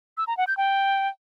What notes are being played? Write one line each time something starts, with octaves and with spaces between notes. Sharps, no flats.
E6
A#5
F#5
G6
G5